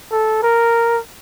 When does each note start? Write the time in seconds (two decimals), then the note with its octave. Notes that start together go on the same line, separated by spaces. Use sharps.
0.12 A4
0.43 A#4